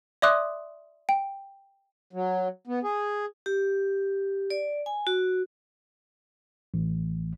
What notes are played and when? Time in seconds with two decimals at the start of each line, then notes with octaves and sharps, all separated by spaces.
0.22 D5 E5 C6 D6 D#6 F#6
1.09 G5
2.13 F#3
2.67 B3
2.83 G#4
3.46 G4
4.50 D5
4.86 G#5
5.07 F#4
6.74 A1